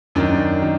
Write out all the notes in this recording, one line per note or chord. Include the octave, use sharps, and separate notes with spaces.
F#2 D#3 D4 D5
D#3